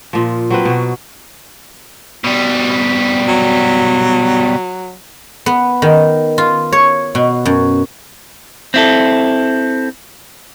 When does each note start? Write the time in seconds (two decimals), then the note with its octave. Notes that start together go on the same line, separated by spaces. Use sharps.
0.13 A#2 F3
0.50 F#3 C4 B4
0.65 B2 F#3
2.24 B2 G3
3.28 F#3
5.46 B3
5.82 D#3
6.38 F4
6.72 C#5
7.15 B2
7.45 F#2
8.74 C4 E4 A4